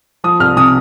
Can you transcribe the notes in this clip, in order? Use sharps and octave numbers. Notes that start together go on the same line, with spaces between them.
F3 D#6
C2 F6
C3 D#6